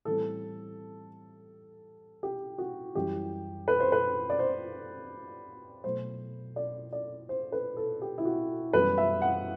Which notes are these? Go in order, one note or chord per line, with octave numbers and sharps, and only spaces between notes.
A2 E3 G3 C4 A4
G4
F#4
F#2 E3 G3 G4
B4
C5
B4
D5
C5
B2 F#3 A3 C5
D5
D5
C5
B4
A4
G4
E4
F#4
F#2 E3 G3 B3 B4
E5
F#5